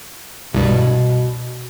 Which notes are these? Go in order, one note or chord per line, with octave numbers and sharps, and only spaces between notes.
C2 G2 B2